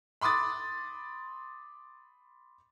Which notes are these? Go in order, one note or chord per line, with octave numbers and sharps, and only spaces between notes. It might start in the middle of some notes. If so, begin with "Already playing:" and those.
B5 C6 D6 D#6 A6